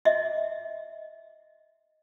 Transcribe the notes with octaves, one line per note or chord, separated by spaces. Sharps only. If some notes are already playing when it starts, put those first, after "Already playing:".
D#5 E5